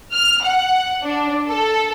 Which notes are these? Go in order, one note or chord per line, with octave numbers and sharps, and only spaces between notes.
F6
F#5
D4
A4